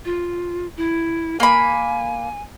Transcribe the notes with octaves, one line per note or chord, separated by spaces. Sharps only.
F4
E4
A#3 G#5 B5